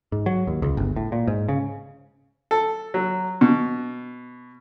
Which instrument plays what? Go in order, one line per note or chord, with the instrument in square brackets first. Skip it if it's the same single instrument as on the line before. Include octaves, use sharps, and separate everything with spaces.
[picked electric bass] G#2
F#3
D#2
C#2
G1
A2
A#2
G#2
C#3
[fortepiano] A4
F#3
B2